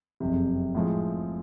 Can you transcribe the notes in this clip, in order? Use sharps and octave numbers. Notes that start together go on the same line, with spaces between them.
F#1 F2 C3
A2 F3 G#3